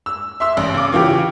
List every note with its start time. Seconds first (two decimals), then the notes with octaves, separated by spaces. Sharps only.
0.06 E6
0.40 E5 C6 E6
0.57 A1
0.74 C#3 D6
0.92 C#3 E3 F4 G4